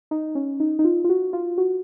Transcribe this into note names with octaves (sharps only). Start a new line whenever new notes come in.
D#4
C#4
D#4
D#4
F4
F4
F#4
F4
F#4